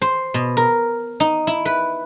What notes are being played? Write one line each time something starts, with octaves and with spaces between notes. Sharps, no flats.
C5
B2
A#4
D#4
E4
B4